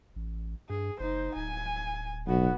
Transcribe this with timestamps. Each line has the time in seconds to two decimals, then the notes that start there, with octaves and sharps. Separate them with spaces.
0.16 A1
0.70 G2 G#4
1.00 F#1 D#4 C5
1.35 D1 G#5
2.27 B1 B3 F#4